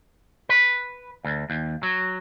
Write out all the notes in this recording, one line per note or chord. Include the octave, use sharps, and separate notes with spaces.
B4
D2
D#2
F#3